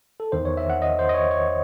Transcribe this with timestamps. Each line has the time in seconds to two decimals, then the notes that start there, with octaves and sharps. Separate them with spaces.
0.20 A4
0.32 E2 D#3 C5
0.45 C#5
0.57 E5
0.70 F#5
0.82 D#5
0.99 C5
1.09 D#5
1.14 C#5
1.31 C#5